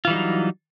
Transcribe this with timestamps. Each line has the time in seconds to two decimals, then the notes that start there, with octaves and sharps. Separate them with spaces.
0.05 F4
0.07 E3
0.10 G3
0.13 D#4
0.15 F#3